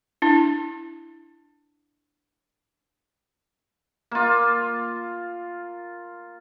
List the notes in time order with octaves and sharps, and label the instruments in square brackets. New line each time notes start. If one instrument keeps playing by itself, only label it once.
[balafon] D4 E4
[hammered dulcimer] A#3 F4